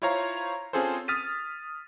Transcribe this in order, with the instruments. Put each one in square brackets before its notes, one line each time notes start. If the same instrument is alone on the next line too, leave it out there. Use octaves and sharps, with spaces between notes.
[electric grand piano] E4 F4 C5 C#5 F5 A#5
C4 C#4 F4 G#4 A4 C5
D#6 F6 A6 B6 D#7